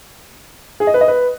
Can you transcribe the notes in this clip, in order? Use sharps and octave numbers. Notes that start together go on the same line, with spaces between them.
G#4
D#5
B4
D#5
B4